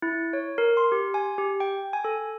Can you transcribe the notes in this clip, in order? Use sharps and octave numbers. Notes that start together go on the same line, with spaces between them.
E4
C#5
A#4
C6
G4
G#5
G4
G5
G#5
A4